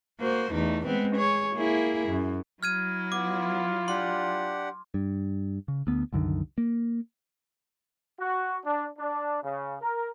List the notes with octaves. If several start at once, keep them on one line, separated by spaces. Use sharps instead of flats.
A#3 F#4 C5
E2 A3 D#4
G#3 B3 C4
G#4 C#5
A#3 E4 G#4
F#2
F#3 E4 F6 G#6 D#7
B3 F4 D6
D4 G4 F#5 C6
G2
C#3
D2 B3
C2 F#2 D3 D#3
A#3
F#4
D4
D4
C#3
A#4